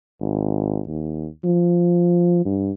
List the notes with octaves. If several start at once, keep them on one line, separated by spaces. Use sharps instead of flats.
G#1
D#2
F3
G2